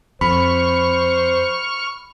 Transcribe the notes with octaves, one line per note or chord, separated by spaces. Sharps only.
F2 C5 B5 C#6 F6